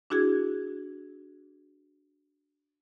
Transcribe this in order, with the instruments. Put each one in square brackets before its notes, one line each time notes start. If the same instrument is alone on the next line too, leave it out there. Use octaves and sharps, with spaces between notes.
[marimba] D4 E4 F#4 G#4 G#6